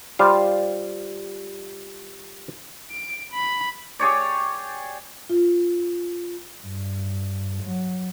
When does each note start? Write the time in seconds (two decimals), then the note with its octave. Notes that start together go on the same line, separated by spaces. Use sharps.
0.19 G3 F4 C5 F5
2.91 D7
3.33 B5
3.99 G4 G#4 C#5 D5
5.30 F4
6.63 G2
7.63 F#3